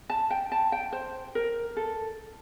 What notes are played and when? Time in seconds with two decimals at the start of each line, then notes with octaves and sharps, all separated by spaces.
0.10 A5
0.30 G5
0.52 A5
0.72 G5
0.92 C5
1.35 A#4
1.77 A4